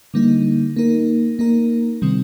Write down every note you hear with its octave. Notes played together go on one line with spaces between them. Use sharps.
D3 G3 A#3 D#4
A#3 D#4 A#4
A#3 D#4 A#4
C3 D#3 G3 C4